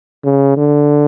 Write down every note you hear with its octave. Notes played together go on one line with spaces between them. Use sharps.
C#3
D3